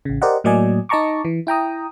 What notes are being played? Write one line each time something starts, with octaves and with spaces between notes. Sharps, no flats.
A1 C#3
G4 A#4 C5 D5 D#5 F#5
A2 F#3 A#3 D5 D#5 G#5
D#4 D#5 A5 A#5 C#6 D6
E3
E4 G5 A#5 D#6